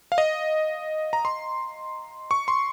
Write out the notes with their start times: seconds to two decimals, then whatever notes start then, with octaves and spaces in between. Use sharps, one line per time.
0.12 F5
0.18 D#5
1.13 A#5
1.25 C6
2.31 C#6
2.48 C6